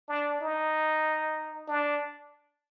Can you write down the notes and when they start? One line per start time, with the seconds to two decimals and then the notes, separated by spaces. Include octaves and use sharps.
0.09 D4
0.41 D#4
1.68 D4